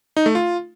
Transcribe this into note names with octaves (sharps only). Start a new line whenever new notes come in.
D#4
A3
F4